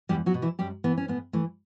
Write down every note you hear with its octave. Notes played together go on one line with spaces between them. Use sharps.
E2 G3 G4
F#3 F#4
B2
E3 E4
F#2 G3 G4
E3 B3
C#4
A2 B3
E3 A3